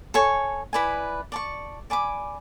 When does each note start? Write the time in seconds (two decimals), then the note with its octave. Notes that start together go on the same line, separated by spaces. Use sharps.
0.14 A4 C#5 G#5 C#6
0.73 E4 B4 D5 G#5
1.32 D5 A5 C#6
1.90 D5 G#5 B5 D6